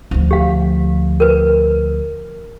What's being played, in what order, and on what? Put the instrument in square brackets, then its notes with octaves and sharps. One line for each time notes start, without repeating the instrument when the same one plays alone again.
[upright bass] D2 F3
[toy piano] G4 F5
A#4 B4